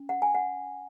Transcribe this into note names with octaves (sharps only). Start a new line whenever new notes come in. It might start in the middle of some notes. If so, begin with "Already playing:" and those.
Already playing: C#4
F#5
G#5
F#5